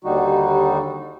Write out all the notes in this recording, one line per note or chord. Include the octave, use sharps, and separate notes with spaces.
D#2 D3 G3 D#4 F#4